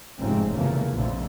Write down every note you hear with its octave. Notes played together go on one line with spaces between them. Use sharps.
F1 G#2 C#3 C4
F1 E2 C#3 A3 A#3
A#1 F2 A#2 D3 A3